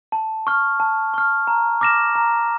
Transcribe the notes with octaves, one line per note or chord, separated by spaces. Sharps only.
A5
C#6 F6
A5
C#6 F6
A#5
D6 F6 A#6 E7
A#5